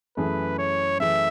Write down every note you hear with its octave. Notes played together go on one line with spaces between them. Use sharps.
F#2 E3 A3 E4 G#4 B4
C#5
F#2 E3 A3 E4 G#4 E5